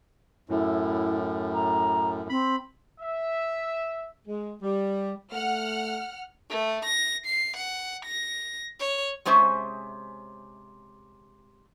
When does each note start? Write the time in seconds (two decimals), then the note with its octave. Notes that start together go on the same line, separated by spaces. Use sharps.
0.49 F#2 A2 E4
1.53 A#5
2.30 C4 B5
3.00 E5
4.27 G#3
4.62 G3
5.33 A3 F#5 F6
6.50 A3
6.85 A#6
7.26 C7
7.57 F#5
8.05 A#6
8.80 C#5
9.25 C3 G#3 C#4 C5 E5